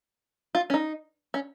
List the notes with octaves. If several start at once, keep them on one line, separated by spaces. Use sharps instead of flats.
F4
C#4
D#4
C#4